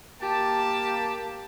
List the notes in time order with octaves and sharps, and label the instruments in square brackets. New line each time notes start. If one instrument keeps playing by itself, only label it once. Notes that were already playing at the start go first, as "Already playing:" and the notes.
[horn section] A#3 A5 [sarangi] G4